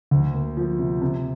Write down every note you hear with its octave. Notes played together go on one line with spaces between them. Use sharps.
D2
A#3
F3
C3
C3